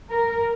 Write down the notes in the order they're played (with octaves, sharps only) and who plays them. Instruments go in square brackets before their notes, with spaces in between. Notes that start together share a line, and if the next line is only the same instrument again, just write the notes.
[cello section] A#4